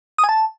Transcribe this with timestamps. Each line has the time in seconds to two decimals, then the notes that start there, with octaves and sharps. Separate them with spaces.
0.18 D#6
0.24 G#5
0.29 A5